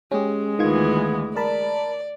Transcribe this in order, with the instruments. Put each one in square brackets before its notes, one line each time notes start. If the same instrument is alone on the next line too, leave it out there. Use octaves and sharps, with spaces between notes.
[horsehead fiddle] G#3 [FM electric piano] C#4 G4
[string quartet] D2 E3 B3 [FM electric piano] D#3 F4 G#6
[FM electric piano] A#4 A5 B5 [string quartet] D5